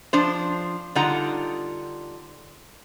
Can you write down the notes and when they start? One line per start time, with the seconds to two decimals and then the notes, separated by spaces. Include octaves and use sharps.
0.13 F3 D4 C5
0.95 D3 G3 D#4 F4 F#5 A#5